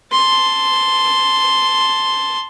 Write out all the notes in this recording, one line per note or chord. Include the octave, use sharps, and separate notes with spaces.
A5 C6